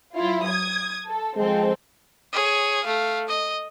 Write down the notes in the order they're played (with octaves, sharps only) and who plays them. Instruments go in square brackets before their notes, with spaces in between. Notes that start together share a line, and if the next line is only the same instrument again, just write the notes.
[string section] F#3 E4 F4
D#6 G#6
A4
[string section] F3 C4 A4 [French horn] G#3
[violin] G#4 C#5
A3 F5
D#5